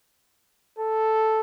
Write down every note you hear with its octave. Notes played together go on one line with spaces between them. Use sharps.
A4